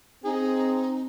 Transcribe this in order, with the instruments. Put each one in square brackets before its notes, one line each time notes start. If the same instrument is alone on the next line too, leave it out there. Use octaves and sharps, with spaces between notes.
[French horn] C4 [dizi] D#4 [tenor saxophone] G#4